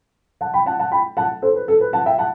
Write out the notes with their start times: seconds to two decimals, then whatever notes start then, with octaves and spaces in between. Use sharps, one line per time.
0.41 F#5 A5
0.53 G5 B5
0.66 F#5 A5
0.79 F#5 A5
0.91 G5 B5
1.17 F#5 A5
1.42 A4 C5
1.55 B4
1.68 A4
1.81 B4
1.93 F#5 A5
2.06 E5 G5
2.18 F#5 A5